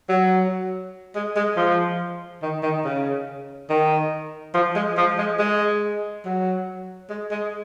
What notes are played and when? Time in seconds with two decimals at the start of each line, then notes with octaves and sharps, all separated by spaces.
0.09 F#3
1.15 G#3
1.36 G#3
1.57 F3
2.42 D#3
2.63 D#3
2.85 C#3
3.70 D#3
4.54 F3
4.76 G#3
4.98 F3
5.18 G#3
5.39 G#3
6.25 F#3
7.10 G#3
7.31 G#3